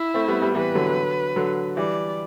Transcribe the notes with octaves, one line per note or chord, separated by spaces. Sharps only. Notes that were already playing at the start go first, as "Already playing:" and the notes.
Already playing: E4
A3 C4
G3 B3
G3 B3
E3 G3 B4
D3 F#3
D3 F#3
E3 G3 D5